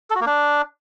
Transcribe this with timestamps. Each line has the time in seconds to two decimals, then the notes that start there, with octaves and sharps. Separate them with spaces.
0.10 A4
0.16 F#4
0.21 A#3
0.26 D4